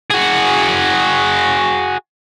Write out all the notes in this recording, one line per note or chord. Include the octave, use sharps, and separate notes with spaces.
F#4 G#4